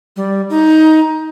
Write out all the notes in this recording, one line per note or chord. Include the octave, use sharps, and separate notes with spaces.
G3
D#4